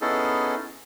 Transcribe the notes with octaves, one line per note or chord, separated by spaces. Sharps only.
B3 C#4 D#4 E4 G#4 A4